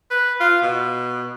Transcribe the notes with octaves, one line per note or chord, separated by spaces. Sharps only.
B4
F4
B2